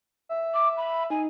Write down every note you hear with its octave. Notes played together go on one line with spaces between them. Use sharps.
E5
D6
B5
D#4 G#5